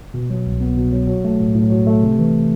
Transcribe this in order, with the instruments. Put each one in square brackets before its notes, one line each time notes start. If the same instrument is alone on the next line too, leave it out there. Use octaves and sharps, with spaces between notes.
[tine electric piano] B2
F#3
C2
B3
B2
F#3
F#3
A3
A2
A2
F#3
A3
C3
E3